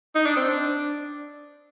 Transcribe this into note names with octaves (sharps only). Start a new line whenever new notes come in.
D#4
D4
C4
D4